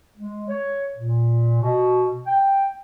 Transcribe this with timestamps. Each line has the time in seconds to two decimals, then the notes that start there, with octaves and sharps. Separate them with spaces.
0.17 G#3
0.49 C#5
0.97 A#2
1.61 B2
2.26 G5